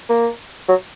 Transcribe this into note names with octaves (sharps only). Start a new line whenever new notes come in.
A#3
F#3